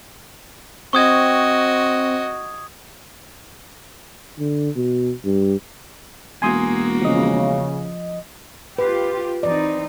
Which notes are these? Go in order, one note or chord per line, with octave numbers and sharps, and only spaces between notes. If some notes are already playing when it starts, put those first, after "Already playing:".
C4 F#4 D#5 C#6 D#6 G#6
D3
B2
G2
E1 A#3 F#4 G#5 C6 D#6
C#3 F3 D#5
F4 G4 B4
E3 C4 D#4 D5